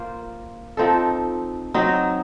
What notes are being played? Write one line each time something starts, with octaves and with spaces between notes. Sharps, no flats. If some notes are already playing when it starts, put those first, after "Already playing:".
Already playing: A#3 F4 C5
F3 C4 D#4 A4
F#3 C4 D#4